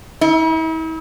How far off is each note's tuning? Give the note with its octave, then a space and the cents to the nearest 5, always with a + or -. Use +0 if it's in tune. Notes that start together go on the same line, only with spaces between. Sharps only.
E4 -45